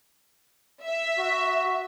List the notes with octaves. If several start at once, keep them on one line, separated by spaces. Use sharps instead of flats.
E5
F#4